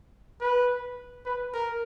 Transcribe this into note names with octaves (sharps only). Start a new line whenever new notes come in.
B4
B4
A#4